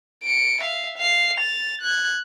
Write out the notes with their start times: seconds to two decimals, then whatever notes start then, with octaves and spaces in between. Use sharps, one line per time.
0.24 C#7 D7
0.62 E5 F5
0.98 F5 C7
1.38 A6 F7
1.82 F#6 G#6